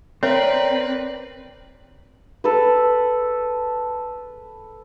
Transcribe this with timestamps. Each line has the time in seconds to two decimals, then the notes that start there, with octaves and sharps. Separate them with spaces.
0.23 C4 A#4 B4 C#5 D5 E5
2.44 A4 B4